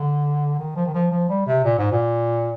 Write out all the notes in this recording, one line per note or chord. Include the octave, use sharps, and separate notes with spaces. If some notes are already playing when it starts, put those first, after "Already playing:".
Already playing: D3
D#3
F3
D#3
F3
F3
G3
C3
A#2
G#2
A#2